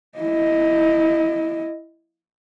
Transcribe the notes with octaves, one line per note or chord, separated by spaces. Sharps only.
E4 D#5